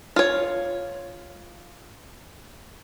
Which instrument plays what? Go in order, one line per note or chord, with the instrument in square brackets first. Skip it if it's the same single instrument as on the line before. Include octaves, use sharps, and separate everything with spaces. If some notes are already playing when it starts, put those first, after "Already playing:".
[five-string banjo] F4 C#5